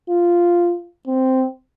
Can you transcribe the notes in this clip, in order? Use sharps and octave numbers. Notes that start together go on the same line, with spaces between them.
F4
C4